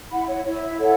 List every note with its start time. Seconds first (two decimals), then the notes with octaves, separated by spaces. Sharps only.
0.11 E4 F#5 B5
0.28 C#5 F#5
0.45 E4 C#5
0.63 E5
0.80 A4 C#5 F#5